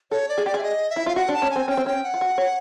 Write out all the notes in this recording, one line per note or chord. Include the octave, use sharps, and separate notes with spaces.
A4 C#5
D5
G#4
G4 D5
G#4 E5
D#5
E5
E4
F4 F5
F#4 F#5
D4
A5
C#4
G#5
C4
C#4 G5
C4
C#4 G5
F#5
F4
F#4
C#5